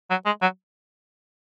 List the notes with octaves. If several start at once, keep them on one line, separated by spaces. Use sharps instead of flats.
F#3
G#3
F#3